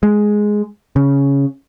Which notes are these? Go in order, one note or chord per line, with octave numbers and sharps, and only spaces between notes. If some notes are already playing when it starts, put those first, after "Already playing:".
G#3
C#3